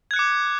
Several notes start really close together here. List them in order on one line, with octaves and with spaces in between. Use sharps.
G#6 F#6 C#7 D6